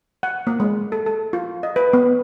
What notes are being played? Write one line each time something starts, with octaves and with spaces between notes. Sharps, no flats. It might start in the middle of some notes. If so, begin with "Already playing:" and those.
F#5
A#3
G#3
A4
A4
F4
D#5
B4
B3